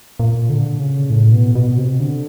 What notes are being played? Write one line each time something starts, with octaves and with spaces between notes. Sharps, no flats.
A#2
D3
C#3
A2
B2
B2
C3
D3